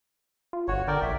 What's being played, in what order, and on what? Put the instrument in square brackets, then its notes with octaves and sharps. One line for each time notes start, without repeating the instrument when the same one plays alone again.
[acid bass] F4
[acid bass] G1 [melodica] F#4 C#5
[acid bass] D3 [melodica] A#4 D5 G5
[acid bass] A#1 [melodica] E5